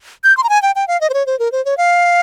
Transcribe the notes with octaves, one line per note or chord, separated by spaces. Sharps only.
G6
C6
A#5
G#5
G5
G5
F5
D#5
C5
C#5
C5
A#4
C5
C#5
F5